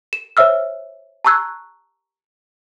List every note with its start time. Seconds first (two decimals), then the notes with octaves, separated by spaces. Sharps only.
0.13 E7
0.37 C5 C#5 E5 E6 F6
1.25 A5 A#5 C#6 E6 F#6 G#6